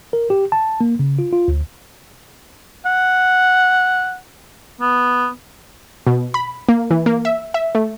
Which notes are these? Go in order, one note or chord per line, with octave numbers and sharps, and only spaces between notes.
A#4
G4
A5
A#3
C#3
F4
F4
D2
F#5
B3
B2
B5
A#3
E3
A#3
E5
E5
A3